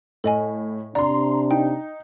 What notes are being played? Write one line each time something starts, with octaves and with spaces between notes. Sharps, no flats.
A2 A4 D#5 G#5
C3 D4 D5 A#5 C6
D#4 G5